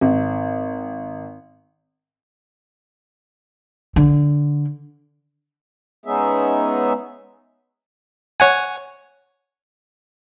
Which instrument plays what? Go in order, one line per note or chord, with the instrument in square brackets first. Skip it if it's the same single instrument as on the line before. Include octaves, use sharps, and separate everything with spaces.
[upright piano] G#1
[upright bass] D3
[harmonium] G#3 B3 C#4 D#4 G#4 E5
[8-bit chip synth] C#5 F#5 G#5